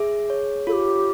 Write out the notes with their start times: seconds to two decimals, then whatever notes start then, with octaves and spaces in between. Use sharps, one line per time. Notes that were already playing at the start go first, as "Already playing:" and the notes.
Already playing: G#4 E5
0.30 C#5
0.67 F4 A4
0.72 G4